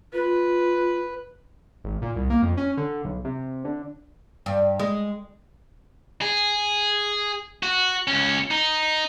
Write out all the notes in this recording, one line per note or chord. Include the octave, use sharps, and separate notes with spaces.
F4 B4
G#1
A#2
C2
A#3
F2
C#4
D3
B1
C3
D3
G2
G#3
G#4
F#4
C#2 C#4
D#4